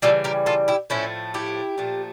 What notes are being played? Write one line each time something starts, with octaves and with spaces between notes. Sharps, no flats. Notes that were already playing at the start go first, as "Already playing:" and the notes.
C#3 E3 G3 F4 A4
G4 A#4
F4 A4
E4 G4
A2 F3 A3 C#4 E4
E4 G4
A#2 F3 A3